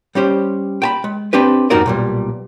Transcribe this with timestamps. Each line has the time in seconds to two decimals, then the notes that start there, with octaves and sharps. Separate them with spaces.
0.15 G3 C#4 G4 C5
0.82 G5 A5 B5
1.04 G#3
1.33 C4 D4 G4 B4
1.70 F2 G#2 D#4 F#4 A#4 D5
1.86 B1 A#2 G3